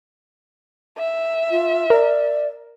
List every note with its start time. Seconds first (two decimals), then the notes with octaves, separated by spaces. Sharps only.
0.98 E5
1.50 F4
1.90 A#4 D5